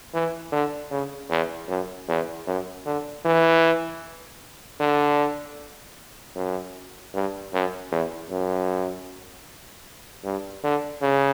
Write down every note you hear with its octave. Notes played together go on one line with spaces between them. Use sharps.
E3
D3
C#3
E2
F#2
E2
F#2
D3
E3
D3
F#2
G2
F#2
E2
F#2
G2
D3
C#3